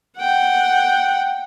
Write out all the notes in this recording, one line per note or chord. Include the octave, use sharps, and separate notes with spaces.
F#5 G5